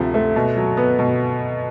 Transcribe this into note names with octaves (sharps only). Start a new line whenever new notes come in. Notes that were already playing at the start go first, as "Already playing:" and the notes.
Already playing: D2 C3 F3 A3
A3
B2
F#3
B3
B2